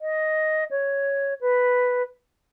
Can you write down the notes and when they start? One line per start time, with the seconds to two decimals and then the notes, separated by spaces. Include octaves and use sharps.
0.01 D#5
0.71 C#5
1.41 B4